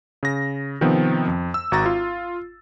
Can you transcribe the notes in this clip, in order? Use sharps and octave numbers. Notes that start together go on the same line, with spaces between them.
C#3 A#6
C3 D#3 F3 B3 C4
F2
E6
G#1 F#4 A#5 A6
F4